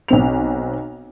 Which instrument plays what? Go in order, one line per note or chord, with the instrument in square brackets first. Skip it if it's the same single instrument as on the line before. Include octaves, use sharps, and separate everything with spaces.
[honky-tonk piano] B1 C4 F7